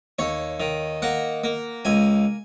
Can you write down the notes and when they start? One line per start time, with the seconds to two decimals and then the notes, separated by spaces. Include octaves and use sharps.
0.19 D#2 C#5
0.60 D#3
1.02 A#3 F#5
1.44 A#3
1.85 C#2 G#5